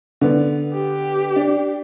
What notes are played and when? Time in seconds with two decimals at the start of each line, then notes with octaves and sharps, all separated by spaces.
0.21 D3 B3
0.73 G4
1.36 D4